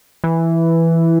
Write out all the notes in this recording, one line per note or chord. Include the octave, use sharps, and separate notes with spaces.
E3